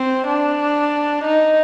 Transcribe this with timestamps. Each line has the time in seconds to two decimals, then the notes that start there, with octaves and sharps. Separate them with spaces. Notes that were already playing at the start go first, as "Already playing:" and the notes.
Already playing: C4
0.27 D4
1.24 D#4